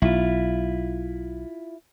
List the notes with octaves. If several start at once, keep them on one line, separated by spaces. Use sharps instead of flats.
B1 E4 F4